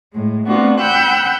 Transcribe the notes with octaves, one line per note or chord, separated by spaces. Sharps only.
A2 G#3
A3 B3 C4 D4 F4 F#4
F#5 G5 B5 E6 F#6 G6